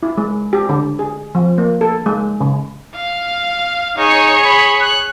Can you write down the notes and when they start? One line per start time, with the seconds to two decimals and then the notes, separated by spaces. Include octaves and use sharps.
0.03 E4
0.18 G#3
0.53 G4
0.69 D3
0.99 G#4
1.35 F3
1.58 A#3
1.81 A4
2.06 G#3
2.41 C#3
2.95 F5
3.97 D#4 G#4 C#5
4.45 B5
4.81 F#6